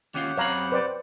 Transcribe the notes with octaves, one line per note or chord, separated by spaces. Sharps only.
D#2 C#4 F4 G4 F#5
F#2 C4 C#5 F5 A#5 B5
B4 C5 D5